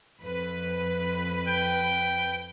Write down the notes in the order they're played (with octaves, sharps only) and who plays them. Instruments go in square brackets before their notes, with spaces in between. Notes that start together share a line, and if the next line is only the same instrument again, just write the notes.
[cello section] F2 B4
[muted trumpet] G5